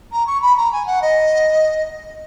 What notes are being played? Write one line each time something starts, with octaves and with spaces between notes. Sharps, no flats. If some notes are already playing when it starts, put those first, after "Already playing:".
A#5
C#6
B5
A#5
G#5
F#5
D#5